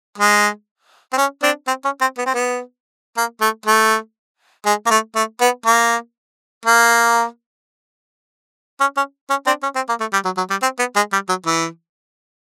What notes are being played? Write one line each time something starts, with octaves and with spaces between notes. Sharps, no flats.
G#3
C4
C#4
C4 D4
C4
C#4
C4
B3
C4
B3
A#3
A3
A3
G#3
A#3
A3
A3
B3
A#3
A#3
C#4
C#4
C#4
C4 D4
C#4
C4
A#3
A3
G3
F#3
F#3
G3
C4
B3
G#3
G3
F#3
E3